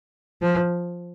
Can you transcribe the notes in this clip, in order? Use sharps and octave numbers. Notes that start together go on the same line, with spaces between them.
F3